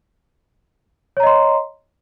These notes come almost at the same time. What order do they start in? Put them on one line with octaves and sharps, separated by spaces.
C#5 A#5 D#5 C6